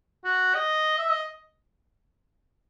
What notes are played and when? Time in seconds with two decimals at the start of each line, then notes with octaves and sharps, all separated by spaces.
0.24 F#4
0.54 D#5
0.98 E5
1.11 D#5